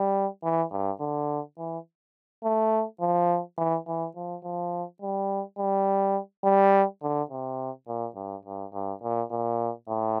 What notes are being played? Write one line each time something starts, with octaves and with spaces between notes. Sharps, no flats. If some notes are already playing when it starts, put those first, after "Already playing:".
Already playing: G3
E3
G2
D3
E3
A3
F3
E3
E3
F3
F3
G3
G3
G3
D3
C3
A#2
G2
G2
G2
A#2
A#2
A2